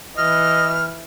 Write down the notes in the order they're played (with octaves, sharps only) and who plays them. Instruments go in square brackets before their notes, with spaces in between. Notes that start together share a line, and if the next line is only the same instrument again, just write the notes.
[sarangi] E3 [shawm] D#5 [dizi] F6